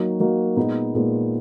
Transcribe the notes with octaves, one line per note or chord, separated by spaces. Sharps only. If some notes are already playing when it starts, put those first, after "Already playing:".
Already playing: F#3 A#3 D#4 F#4
F#3 A#3 D#4 F#4
A#2 G#3 B3 D#4
A#2 G#3 B3 D#4